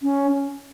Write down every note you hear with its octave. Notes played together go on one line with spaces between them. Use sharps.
C#4